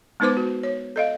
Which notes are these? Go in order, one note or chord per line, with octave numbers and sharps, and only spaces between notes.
G#3 B3 D#4 B4 C5 D6
F#4
C#5
A4 D#5 F5